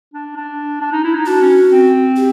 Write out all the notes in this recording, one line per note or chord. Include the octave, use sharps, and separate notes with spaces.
D4
D4
D4
D#4
E4
D#4
D4 F#4
C#4
C4
G4